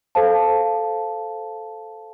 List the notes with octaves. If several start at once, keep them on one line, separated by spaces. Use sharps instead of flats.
A4 C5 F5 A5